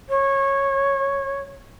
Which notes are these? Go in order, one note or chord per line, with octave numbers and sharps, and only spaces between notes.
C#5